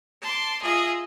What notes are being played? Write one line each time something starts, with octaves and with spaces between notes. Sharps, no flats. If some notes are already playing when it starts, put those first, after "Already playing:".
A5 C6 D6
F4 G#4 D#5 E5